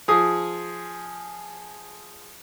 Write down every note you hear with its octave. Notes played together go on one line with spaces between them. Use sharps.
F3 G#4 D#6